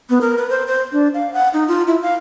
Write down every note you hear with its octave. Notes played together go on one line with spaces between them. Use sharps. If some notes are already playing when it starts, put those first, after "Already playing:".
B3
A#4
B4
C5
C5
D4
F5
F#5
D#4
F4
E4
F5